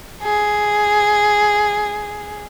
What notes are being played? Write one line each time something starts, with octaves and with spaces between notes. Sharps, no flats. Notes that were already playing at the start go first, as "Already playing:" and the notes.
G#4